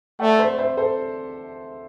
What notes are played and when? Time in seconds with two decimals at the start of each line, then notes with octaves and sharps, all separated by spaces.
0.20 A3 D5 F#5
0.39 C5 E5
0.58 C5 E5
0.77 A4 C5